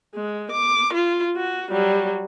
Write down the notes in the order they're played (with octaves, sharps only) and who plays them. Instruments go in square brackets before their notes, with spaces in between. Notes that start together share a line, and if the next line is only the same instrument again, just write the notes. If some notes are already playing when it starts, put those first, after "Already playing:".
[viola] G#3
D6
F4
F#4
F#3 G3